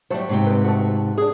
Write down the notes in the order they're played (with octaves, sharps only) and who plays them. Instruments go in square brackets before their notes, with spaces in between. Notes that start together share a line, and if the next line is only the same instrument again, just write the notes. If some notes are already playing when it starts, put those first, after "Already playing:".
[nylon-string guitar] F#3 G3 [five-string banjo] A3 C5
[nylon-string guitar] G#2 C3 G5
[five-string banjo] C4 B4
A3 F#4
D4 G#4